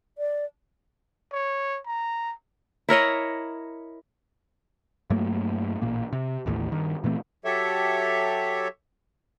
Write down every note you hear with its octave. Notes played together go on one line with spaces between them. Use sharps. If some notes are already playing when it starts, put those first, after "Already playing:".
D5
C#5
A#5
E4 A#4 C#5 D#5
G2 F#3 A3 A#3
A1 A#2 A#3
C3
A1 D#2 A2 E3
G2 D#3
A#2 E3 A3 C4
F#3 G4 A4 C#5 E5